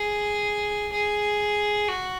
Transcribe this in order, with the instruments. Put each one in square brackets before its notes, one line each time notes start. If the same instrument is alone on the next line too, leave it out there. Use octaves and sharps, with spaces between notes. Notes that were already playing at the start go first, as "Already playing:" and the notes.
Already playing: [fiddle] G#4
G#4
F#4